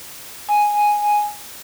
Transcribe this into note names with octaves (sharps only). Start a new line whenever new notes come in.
G#5